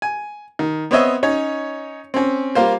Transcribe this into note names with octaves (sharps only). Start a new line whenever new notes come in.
G#5
D#3
B3 C4 C5 C#5 D#5 E5
C#4 D#4 C#5
C4 C#4
G3 A#3 F4 C5